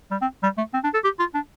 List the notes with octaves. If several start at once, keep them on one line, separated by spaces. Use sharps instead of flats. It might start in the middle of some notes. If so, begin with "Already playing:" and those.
G3
C4
G3
A3
C4
D4
A4
G4
F4
D4